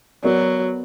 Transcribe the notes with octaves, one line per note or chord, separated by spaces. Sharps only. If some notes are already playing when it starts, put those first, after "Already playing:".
F#3 B3 F#4 A#4 D5